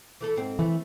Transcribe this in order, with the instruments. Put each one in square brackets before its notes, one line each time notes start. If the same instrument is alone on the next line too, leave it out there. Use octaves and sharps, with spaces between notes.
[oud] E3 A3 A4
G#2 C4
[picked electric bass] E3 [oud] A3